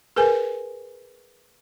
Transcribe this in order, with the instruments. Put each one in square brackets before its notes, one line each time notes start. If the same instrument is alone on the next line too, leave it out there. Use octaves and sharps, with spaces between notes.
[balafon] G#4 A#4 B4 G#5